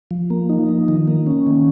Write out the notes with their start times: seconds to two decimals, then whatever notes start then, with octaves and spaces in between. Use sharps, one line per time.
0.11 F3
0.30 A#3
0.49 D#4
0.69 F3
0.88 D#3
1.08 A#3
1.27 C#4
1.47 D#3